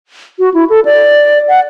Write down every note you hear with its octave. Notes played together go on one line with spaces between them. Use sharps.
F#4
E4
A4
D5
F#5